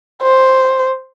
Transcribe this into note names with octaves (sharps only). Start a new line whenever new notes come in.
C5